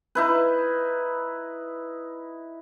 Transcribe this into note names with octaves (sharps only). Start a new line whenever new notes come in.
D#4 E4 B4